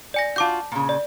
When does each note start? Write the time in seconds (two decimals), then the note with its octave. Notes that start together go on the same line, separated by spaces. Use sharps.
0.14 D5 G#5 A#6
0.36 F4 F#4 A5 D6 G6
0.72 A#2 C#3
0.89 D5